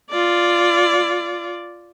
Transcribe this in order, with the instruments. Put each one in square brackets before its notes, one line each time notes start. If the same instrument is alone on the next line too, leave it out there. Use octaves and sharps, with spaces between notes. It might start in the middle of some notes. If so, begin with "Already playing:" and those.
[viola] F4 D5